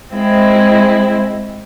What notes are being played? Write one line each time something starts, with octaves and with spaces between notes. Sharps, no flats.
G#3 C4 E4